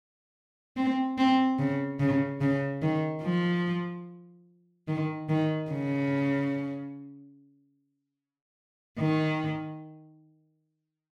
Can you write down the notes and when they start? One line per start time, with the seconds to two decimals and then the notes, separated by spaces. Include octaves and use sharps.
0.77 C4
1.18 C4
1.59 C#3
2.00 C#3
2.41 C#3
2.82 D#3
3.23 F3
4.88 D#3
5.29 D#3
5.70 C#3
8.99 D#3